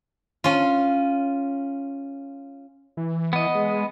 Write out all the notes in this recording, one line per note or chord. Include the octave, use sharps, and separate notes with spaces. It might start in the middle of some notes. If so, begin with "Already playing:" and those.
C#4 F4
E3
B3 D#5
G#3